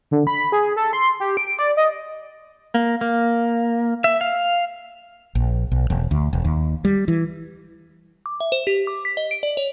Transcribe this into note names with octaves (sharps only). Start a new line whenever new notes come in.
D3
B5
G#4
A4
C6
G4
D7
D5
D#5
A#3
A#3
E5
F5
A#1
B1
E1
D2
E1
D#2
G3
E3
D6
E5
C5
G4
D6
B6
D#5
D7
D5
C#5